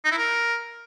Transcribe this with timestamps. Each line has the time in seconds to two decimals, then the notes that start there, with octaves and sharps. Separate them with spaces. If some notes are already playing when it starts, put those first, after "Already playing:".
0.05 D#4
0.11 E4
0.18 A#4